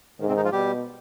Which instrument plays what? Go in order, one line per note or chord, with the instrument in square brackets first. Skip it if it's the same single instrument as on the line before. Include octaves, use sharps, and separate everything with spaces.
[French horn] G#2 [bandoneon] D#3
[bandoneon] C3 C4
D#3 D#4
F3 F4
[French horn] B2 [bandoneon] G3 G4